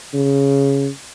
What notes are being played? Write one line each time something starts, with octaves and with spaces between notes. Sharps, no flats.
C#3